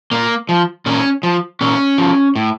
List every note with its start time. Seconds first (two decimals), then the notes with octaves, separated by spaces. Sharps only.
0.11 A#2 A#3
0.49 F3
0.86 A#2 C#4
1.23 F3
1.61 A#2 C#4
1.98 F3
2.36 A2